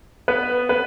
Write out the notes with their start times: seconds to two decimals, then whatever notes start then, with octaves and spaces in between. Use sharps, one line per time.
0.28 B3 B4
0.69 B3 B4